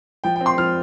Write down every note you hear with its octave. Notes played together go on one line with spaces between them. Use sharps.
F3 G5
C4 G5
C6
F3 F6